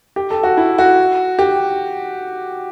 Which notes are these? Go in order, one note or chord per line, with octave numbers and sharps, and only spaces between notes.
G4
A4
F#4
E4
F#4
G4